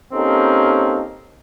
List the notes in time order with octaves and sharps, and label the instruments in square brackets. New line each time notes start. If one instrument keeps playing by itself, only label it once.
[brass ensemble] A#3 C4 C#4 D#4 G4 A4